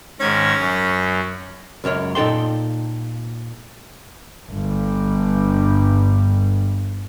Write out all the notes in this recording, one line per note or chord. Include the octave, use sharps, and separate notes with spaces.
G#2 D#3 C#4 G#6
F#2
C#2 F#2 A#4 C#5
A#2 D#4 A4 G5 C6
G1 G2